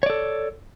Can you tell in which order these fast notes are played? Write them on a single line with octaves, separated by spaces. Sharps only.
C#5 D5 A4